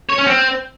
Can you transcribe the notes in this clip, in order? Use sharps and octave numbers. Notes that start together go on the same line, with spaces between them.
C#5
C#4
C4